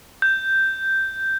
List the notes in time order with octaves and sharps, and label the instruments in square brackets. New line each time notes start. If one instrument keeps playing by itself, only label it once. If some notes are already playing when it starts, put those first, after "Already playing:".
[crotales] G6